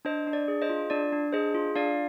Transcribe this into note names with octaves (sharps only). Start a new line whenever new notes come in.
D4 C5 D#5
D4
D5
G#4
C5 D#5
F4
D4 D5
D4
G#4 C5 D#5
F4
D4 D5 F5